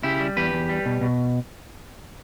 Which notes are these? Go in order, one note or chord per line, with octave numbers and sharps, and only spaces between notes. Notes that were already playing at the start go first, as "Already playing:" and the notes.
C#3 E4 G4
G3
E2 G4 B4
E2
G3
B2
B2